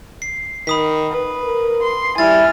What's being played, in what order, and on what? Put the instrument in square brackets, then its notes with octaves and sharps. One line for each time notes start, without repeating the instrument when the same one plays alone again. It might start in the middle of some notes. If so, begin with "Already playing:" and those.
[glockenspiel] C7
[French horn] D#3 [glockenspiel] B5 D#6 B6
[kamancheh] B4
[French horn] A#4
[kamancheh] C6
[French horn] G3 [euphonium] E4 [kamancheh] G#5 F6 [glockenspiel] A6